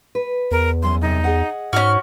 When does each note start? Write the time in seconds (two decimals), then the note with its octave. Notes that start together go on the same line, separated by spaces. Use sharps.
0.15 B4
0.51 E2 A#4
0.83 F#2 E3 C#4 C6
1.01 F#2 C3 D#4
1.24 G#4 D#5 F#5
1.73 G#2 C#4 F#4 F6